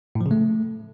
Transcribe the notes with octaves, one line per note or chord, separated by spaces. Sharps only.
A2
F3
C#3
A3